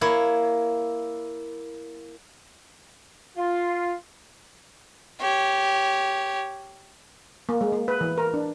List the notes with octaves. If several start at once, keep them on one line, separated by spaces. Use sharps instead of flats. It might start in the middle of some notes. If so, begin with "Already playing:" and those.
A#3 E4 C#5
F4
G4 C#5
A#3
G#3
A#3
B4
E3
A#4
D4